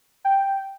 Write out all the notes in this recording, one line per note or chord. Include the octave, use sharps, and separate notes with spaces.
G5